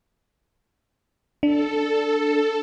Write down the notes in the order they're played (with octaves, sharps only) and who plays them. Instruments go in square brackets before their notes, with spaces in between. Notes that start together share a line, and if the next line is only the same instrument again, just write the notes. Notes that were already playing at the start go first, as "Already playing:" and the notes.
[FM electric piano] D4 [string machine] A4